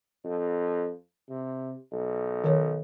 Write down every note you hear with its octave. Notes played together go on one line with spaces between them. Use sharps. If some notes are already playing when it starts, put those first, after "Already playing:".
F2
C3
B1
D#3 C#5